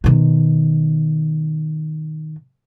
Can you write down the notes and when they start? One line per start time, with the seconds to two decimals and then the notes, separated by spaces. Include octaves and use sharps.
0.04 B2 D#3